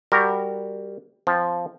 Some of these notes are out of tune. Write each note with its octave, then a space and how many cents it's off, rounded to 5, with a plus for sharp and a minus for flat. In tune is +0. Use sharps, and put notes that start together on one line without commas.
G3 +10 F#4 +10 A#4 -15
F3 +0 C4 +0